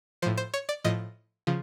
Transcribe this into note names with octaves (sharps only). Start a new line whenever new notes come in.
A2 F3 C5
C5
C#5
D5
A2 F3 D#5
C#3 F3